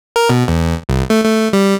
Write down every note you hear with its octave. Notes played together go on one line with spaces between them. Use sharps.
A#4
B2
E2
C2
A3
A3
G3